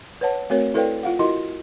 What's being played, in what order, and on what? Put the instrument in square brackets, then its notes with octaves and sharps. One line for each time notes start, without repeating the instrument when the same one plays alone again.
[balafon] B4 C#5 F#5 A5
A3 C4 F#4 A#4 C#5
E4 A4 B4 D5 F5 G5
F4 F5 F#5
E4 F#4 A#4 D#5 C6